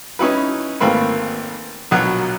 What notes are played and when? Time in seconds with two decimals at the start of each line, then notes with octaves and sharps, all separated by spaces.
0.19 C#4 D#4 E4 B4
0.80 G#1 A3 A#3 C4 B4
1.91 A#1 B2 F#3 F#5